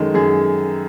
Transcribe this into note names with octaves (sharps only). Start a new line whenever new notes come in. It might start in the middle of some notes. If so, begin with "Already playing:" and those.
Already playing: F#2 D#3 G#3 A4
F#2 G#4